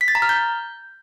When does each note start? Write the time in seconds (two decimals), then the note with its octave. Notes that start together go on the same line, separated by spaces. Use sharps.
0.01 B6
0.08 A6
0.15 A#5
0.22 F6
0.29 G6